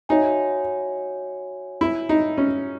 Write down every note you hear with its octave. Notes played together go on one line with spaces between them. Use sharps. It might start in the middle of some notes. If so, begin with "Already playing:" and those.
D#4 F#4 C#5 E5 G#5
E4
D#4
C#4